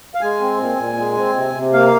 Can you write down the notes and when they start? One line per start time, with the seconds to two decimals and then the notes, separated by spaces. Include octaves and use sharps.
0.15 F5
0.21 G#3 G#5
0.41 C4
0.59 A#2
0.78 A#2
0.97 G#3
1.17 C4
1.36 C3
1.55 C3
1.73 A#3 F5